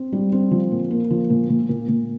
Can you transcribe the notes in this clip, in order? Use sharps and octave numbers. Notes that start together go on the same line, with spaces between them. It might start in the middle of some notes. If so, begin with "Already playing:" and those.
Already playing: C4
G3
C4
F3
A#2
A#3
F3
A#2
A#2
A#2
A#2